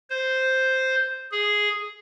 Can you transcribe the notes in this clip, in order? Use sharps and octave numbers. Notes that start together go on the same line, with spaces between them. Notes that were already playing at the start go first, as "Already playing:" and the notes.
C5
G#4